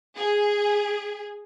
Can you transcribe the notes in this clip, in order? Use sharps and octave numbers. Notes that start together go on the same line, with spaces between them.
G#4